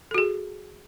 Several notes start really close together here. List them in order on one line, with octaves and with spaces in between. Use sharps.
A4 F#4 G#4